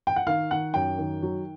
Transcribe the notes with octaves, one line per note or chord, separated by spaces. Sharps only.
G5
F#5
D#3 F5
D#3 F#5
F#2 G5
D#3
F#3